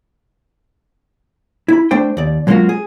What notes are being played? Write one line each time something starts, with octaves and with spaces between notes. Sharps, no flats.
E4 B5
A3 D4 C5 G5
D#2 D5
F#3 G#3 A#3 C#4 F4 F#4
G#4